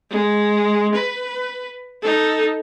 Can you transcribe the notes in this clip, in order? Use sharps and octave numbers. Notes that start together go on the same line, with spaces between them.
G#3
B4
D#4 A4